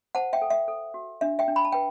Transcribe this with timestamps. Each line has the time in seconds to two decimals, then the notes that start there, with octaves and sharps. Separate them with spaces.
0.15 C5 F#5 A5
0.33 E5 G5
0.42 A4
0.50 E5
0.68 A4
0.94 F#4
1.21 D4 E5
1.39 E5 G5
1.48 D4
1.56 B5
1.65 A5
1.72 B4 G5